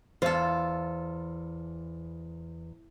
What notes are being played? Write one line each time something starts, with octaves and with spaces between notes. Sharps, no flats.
E2 F4 A4 C5